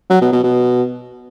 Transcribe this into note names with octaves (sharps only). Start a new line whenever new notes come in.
F#3
B2
B2
B2